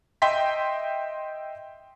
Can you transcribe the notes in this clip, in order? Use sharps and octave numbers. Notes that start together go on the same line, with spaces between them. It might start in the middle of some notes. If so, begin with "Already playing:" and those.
D#5 E5 G5 C6 B6